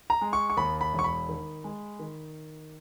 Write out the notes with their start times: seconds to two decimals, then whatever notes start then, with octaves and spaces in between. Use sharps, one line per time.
0.10 A#5
0.21 G#3
0.33 C#6
0.50 C#6
0.57 D#2 B5
0.81 B5
0.93 E1
0.99 C#6
1.04 B5
1.29 D#3
1.64 G#3
1.99 D#3